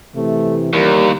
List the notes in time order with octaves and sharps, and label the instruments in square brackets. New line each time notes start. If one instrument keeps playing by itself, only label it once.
[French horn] C3 [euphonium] E3 [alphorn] A3
[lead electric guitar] D#2 [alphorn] G3 [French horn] A#4